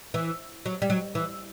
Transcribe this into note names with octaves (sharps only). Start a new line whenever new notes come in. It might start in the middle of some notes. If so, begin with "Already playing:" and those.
E3
F#3
G3
F#3
E3